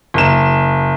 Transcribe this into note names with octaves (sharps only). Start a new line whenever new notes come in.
F#1 E7